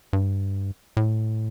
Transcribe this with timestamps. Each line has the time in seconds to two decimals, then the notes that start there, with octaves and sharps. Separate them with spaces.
0.13 G2
0.97 A2